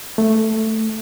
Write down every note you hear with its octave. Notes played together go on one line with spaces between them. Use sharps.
A3